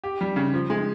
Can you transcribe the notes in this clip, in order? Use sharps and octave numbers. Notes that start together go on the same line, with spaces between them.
G4
G3
C#3
F3
G#3